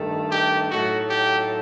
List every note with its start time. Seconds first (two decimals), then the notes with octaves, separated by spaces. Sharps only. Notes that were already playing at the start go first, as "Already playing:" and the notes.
Already playing: G2 D#3 A3
0.30 G4
0.69 A2 F#3 A3 D#4 F#4
1.09 G4